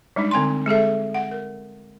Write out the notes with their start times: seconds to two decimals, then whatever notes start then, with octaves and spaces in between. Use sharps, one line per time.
0.16 G3 G#3 D4 D#4
0.31 D3 C4 G5 G#5 C6
0.66 G#3 G#4 A4 E5
1.14 F#5
1.31 A#4